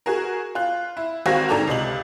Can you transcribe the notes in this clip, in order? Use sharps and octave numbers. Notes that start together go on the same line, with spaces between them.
F#4 G#4 A#4
F4 F#6
E4
G#1 C4 F#4 F5 G#6 A#6
G#2 D3 A4 D5 A#5 F7
C#2 C3 D#5 F#7